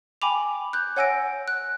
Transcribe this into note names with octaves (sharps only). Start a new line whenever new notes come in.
G5 G#5 B5 D6 F7
F#6 G6
C#5 F#5 G#5 E6 A#6 D7
F#6